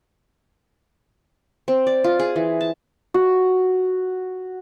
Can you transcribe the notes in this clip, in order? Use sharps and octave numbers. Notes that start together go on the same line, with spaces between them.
C4
D5
F4
G#4
E3
A5
F#4